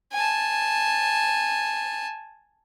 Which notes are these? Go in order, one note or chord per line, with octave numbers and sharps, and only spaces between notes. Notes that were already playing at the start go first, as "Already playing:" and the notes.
G#5 A5